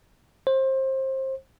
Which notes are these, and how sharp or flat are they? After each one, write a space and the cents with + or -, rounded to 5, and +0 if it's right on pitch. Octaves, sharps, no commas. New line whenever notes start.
C5 +25